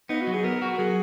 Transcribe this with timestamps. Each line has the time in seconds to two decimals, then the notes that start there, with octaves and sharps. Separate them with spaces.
0.09 B3 D#4
0.22 F#4
0.27 F#3
0.33 G#4
0.44 B3 A#4
0.62 F#4
0.79 F#3 G#4